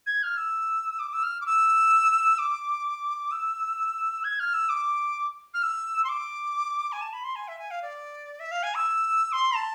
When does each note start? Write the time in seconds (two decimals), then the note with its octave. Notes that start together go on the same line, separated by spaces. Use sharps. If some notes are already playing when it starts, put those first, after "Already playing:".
0.06 G#6
0.23 F6
0.37 E6
0.99 D6
1.13 E6
1.23 F6
1.41 D6
1.46 E6
2.38 D6
3.31 E6
4.24 G#6
4.39 F6
4.54 E6
4.69 D6
5.54 F6
5.63 E6
6.04 C6
6.09 D6
6.92 G#5
7.01 A5
7.13 B5
7.24 C6
7.36 G#5
7.48 E5
7.59 G#5
7.71 F5
7.82 D5
8.40 E5
8.51 F5
8.63 G#5
8.75 E6
9.32 C6
9.55 A5